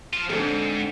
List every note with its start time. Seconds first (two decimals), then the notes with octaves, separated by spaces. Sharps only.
0.13 F3 F4
0.30 E2 G#2 D3 C4 A4